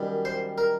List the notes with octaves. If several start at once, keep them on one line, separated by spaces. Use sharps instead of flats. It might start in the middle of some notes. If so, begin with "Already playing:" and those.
Already playing: F#2 D#3 G3
C5
A#4